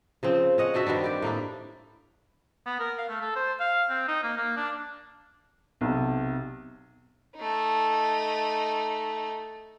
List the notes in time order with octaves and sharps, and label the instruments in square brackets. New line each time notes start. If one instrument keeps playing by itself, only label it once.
[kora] C#3 F3 C4
C#4 D#5 F#5
C4 D4 F#4 E5
G2 D#3 G3 D4
G4 D5
A2 A#3 D4 E4
[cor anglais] B3
A#4
F5
A3
A4
C5
F5
C4
D#4
A#3
A#3
D4
[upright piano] B1 C3
[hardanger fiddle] A3 D#4